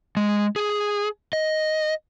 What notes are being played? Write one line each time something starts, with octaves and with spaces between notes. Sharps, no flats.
G#3
G#4
D#5